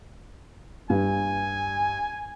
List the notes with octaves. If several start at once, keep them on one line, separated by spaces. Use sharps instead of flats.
G2 G#5